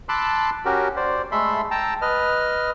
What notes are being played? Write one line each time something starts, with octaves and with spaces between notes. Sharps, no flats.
A5 B5 C6 D6 E6 F#6
C#4 F#4 G4 A#4
C5 D5
G#3 A3 A4 E5 B5 C6
G5 A5 A#5 E6
B4 D#5 F6